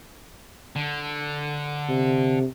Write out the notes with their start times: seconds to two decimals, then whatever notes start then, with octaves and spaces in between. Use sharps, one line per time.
0.76 D3
1.89 C3